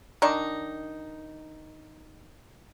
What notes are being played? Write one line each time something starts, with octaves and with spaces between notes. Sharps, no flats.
D#3 D4 D#4